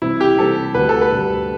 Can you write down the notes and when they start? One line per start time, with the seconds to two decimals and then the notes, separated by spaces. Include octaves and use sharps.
0.02 C3 E3 G3 C4 E4
0.20 G4
0.38 C3 E3 G3 C4 A4
0.74 D2 D3 G3 B4
0.89 A4
1.01 B4
1.12 D2 D3 G3